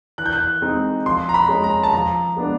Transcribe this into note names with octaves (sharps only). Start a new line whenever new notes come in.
E3 F#6
G6
F#6
G#3 C4 D#4
F3 C6
A#5
B5
G#3 C#4
A#5
A5
F3 A#5
G#3 B3 D4